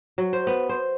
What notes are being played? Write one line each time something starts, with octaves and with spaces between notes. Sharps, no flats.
F#3
C5
B3
C5